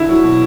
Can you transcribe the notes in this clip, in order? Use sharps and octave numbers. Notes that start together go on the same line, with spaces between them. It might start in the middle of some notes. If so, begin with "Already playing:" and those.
Already playing: D3 E4
F#3
B2